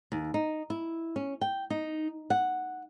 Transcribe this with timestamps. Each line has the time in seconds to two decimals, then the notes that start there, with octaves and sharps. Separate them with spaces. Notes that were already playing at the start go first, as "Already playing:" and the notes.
0.12 D#2
0.34 D#4
0.70 E4
1.16 C#4
1.41 G5
1.70 D#4
2.30 F#5